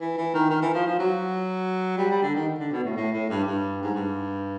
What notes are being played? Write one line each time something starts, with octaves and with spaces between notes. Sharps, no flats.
E3
E3
D#3
D#3
E3
F3
F3
F#3
G3
G3
D3
D#3
D3
B2
A2
A2
A2
G2
G2
G#2
G2